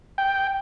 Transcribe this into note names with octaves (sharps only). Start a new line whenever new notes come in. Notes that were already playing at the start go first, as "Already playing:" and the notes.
G5